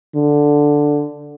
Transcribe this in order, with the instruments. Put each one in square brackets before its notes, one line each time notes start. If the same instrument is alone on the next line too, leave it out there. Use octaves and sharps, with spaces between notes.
[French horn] D3